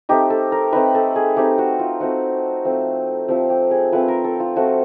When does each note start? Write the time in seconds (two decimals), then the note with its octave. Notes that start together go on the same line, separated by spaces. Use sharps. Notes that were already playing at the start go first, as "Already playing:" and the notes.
0.09 A3 C4 D#4 G4
0.30 A4
0.52 A#4
0.73 A3 C4 D#4 B4
0.95 A4
1.16 G#4
1.37 A3 C4 D#4 G4
1.58 F#4
1.79 F4
2.00 A3 C4 D#4 F#4
2.65 F3 A3 C4
3.28 F3 A3 C4 G4
3.50 G4
3.71 G#4
3.92 F3 A3 C4 B4
4.08 A#4
4.24 A4
4.40 F4
4.56 F3 A3 C4 F#4